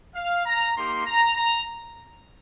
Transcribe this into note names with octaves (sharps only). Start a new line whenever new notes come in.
F5
A#5
A#3 D#4 G4 C6
A#5
A#5